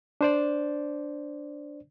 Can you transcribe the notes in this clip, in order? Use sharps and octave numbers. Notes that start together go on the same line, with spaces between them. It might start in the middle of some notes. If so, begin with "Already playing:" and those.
D4 C5 D5